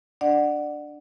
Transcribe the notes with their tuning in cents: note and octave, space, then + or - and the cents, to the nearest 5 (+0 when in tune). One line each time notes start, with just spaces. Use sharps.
D4 +0 D5 +25 F#5 +0